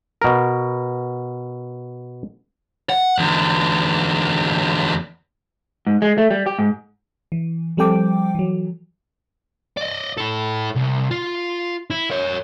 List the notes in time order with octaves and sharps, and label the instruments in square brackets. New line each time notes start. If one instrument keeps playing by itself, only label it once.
[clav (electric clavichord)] B2 A#4
[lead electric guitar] F#5
E2 D3
[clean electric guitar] G#2
G#3
A3
G3
G4
G#2
[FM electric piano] E3
F3 G3 C4 A4 G5 D6
E3 F#3
[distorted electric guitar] D5 D#5
E4 A4
C2
F4
E4
A#4 C#5